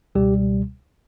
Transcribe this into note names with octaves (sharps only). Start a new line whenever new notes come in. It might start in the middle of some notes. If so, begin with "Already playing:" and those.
C#2 B2 G3 G4